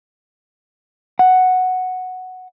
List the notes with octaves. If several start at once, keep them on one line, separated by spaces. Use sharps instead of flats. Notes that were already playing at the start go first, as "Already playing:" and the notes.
F#5